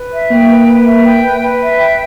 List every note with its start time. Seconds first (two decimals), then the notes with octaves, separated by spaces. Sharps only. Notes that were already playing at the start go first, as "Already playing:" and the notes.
Already playing: B4
0.12 E5
0.31 A#3 G5
0.49 B4
0.68 B4
0.86 E5
1.04 G5
1.23 B4
1.41 B4
1.60 E5
1.78 G5